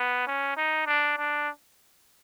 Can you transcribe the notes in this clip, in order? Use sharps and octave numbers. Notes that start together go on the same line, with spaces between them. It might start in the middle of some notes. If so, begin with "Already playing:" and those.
Already playing: B3
C#4
D#4
D4
D4